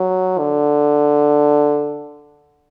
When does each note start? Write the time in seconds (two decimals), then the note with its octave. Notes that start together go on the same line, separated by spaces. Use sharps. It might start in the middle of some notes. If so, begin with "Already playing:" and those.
Already playing: F#3
0.39 D3